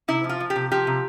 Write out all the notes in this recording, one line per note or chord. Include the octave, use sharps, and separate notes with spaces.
C3 E4
F3
F4
F3
G4
C3
F3 G4
C3